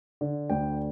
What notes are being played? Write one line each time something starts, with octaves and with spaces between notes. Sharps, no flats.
D3
D2 G5